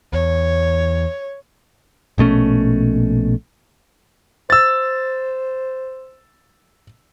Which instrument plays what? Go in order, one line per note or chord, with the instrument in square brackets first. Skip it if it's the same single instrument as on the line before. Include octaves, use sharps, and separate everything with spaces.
[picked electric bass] E2 [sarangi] C#5
[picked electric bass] A#1 B2 A3 C#4
[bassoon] C5 [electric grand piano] E6 A6